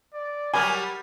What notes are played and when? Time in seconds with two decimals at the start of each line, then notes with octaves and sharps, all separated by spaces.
0.14 D5
0.54 F#3 G3 A#4 G#5 B5 D6 F6